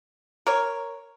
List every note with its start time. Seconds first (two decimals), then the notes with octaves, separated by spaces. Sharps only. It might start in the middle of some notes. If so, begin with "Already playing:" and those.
0.47 A#4 C#5